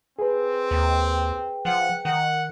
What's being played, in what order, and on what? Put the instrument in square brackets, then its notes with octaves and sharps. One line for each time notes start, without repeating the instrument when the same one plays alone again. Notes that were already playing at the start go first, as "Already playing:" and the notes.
[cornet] C4 [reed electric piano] G#4 B4
[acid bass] D#2 [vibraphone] G5
[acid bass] F3 [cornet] F#5
[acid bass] D#3 [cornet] F#5